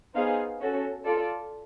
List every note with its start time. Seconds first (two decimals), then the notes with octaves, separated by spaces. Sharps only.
0.15 B3 D#4 G#4 C5 F5
0.61 C#4 F#4 A4
1.05 F4 A4 D5